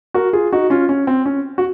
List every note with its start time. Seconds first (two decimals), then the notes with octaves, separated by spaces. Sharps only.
0.14 F#4 A#4
0.33 F4 G#4
0.53 D#4 F#4
0.70 C#4 F4
0.89 C#4
1.07 C4
1.26 C#4
1.58 F#4